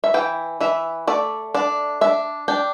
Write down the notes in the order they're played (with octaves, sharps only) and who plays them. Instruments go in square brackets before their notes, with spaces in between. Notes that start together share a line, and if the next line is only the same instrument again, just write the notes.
[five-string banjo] E5
E3 G5
E3 E5
A3 D5
D4 D5
D4 E5
D4 G5